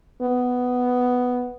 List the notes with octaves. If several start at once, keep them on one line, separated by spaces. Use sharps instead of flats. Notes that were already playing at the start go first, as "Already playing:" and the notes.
B3